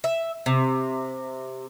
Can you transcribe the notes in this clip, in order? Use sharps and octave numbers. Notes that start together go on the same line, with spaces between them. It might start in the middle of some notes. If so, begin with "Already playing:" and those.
E5
C3